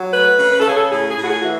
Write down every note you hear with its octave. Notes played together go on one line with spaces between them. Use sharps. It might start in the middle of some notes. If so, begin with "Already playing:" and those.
Already playing: F#3
A3 B4
C#3
B4
A4
C#3 G#4
A4
A2 G#4
G#4
A2
F#4
G#4
E3 F#4